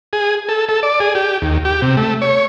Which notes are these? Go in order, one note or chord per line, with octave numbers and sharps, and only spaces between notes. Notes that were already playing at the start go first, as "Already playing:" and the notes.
G#4
A4
A4
D5
G#4
G4
D#2
G4
C3
A3
C#5